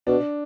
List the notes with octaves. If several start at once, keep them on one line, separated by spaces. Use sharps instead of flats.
B2 D4